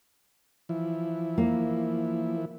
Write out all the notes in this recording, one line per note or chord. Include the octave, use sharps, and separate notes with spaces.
E3 F3 E4
A#3